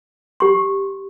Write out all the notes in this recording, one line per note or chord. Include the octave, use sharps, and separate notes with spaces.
G4 C6